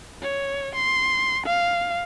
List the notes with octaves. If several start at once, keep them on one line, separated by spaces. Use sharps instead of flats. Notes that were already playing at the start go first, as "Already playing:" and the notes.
C#5
C6
F5